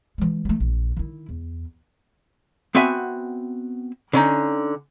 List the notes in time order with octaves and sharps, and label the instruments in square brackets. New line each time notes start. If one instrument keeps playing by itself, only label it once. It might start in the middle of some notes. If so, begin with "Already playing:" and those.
[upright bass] E3 G#3
F#3 A3
A#1
D#3 E4
E2
[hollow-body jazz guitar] B3 C4 F#4 E5 G#5
D3 C#4 D#4